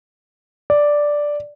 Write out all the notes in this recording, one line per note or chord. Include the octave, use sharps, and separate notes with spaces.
D5